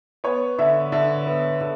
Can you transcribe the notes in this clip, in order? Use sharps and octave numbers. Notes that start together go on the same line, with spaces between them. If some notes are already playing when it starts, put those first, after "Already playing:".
B3 C#5
D3 E5
D3 E5
B3
D3